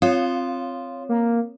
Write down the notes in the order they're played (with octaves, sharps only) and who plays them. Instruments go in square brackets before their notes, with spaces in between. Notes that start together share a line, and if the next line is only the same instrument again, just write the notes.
[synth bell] C4 C#5 [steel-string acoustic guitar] F4
[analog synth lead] A#3